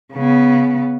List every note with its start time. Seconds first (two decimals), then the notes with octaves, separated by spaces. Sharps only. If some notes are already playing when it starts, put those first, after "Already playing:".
0.13 C#3 B3